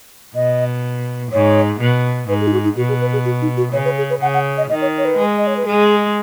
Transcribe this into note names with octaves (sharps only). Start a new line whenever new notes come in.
B2 D#5
G#2 C#5
B2
G#2 B4
G#4
D#4
F#4
D#4
B2 F#4
G#4
B4
G#4
F#4
D#4
F#4
C#3 C#5
B4
G#4
B4
C#3 F#5
F#5
D#5
D#3 D#5
C#5
C#5
B4
G#3
D#5
C#5
B4
G#3 G#4